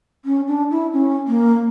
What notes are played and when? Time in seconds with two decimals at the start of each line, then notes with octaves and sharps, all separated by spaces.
0.25 C#4
0.47 D4
0.71 E4
0.93 C#4
1.28 A#3